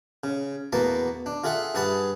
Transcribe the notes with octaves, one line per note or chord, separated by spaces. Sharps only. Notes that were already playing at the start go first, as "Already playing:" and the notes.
C#3
E2 A#3 B3 F#4 A5 B5
D4
F4 G#4 A4 E5 F#5
G2 G#4 F#5 A5 B5 D#6